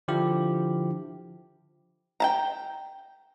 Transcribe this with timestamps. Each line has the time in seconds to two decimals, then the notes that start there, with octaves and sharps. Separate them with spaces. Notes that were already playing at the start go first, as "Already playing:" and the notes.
0.08 D3 F3 E4 G4
2.20 G5 A5 A#5